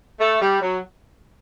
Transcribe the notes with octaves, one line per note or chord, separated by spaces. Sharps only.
A3
G3
F#3